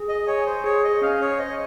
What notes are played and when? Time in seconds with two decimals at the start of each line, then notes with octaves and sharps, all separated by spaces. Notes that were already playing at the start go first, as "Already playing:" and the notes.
Already playing: G#4
0.08 D#5
0.27 C#5 G#5
0.46 C5
0.64 G#4 C#5
0.84 D#5
1.01 C#4 F5
1.21 C#5
1.39 C5 D#5